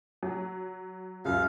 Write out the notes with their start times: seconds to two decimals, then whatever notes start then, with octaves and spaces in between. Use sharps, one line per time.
0.23 F#3
1.25 C#2 F#2 F5